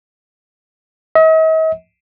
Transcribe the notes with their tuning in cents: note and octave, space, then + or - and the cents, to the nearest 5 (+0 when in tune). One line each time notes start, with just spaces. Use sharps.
D#5 +45